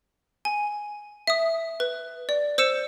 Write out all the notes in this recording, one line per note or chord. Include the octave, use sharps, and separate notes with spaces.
G#5
E5 D#6
B4
D5
C5 E6 C#7 E7